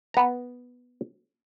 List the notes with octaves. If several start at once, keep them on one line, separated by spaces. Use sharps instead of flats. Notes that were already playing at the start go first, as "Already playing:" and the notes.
B3 A#5